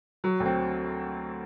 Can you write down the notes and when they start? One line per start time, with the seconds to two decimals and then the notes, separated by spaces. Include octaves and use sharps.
0.24 F#3
0.40 D2
0.45 C4